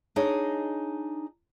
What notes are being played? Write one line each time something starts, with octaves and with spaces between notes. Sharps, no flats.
D4 D#4 G#4 C#5 D#5